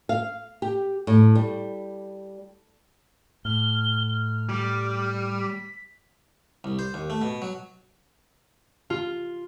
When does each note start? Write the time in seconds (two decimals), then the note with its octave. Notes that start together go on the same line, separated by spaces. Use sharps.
0.09 F5
0.62 G4
1.07 A2
1.35 G3
3.45 A2 F6 G7
4.49 G3 D6
5.41 B6
6.64 C2
6.79 C5
6.94 D#2
7.10 A3
7.22 B2
7.42 F#3
8.90 F4